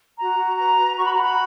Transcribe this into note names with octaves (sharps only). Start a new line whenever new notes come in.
F#4 A#5
F#4
B4 A#5
B4
F#4 C#6
B5
F#4 A#5
B5